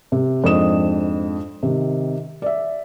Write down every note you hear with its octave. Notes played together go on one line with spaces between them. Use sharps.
C3
F2 G#2 D4 D#5 D#6 E7
C3 D#3
D5 E5